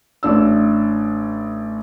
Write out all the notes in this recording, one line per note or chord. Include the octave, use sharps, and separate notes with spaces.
A1 D4 E6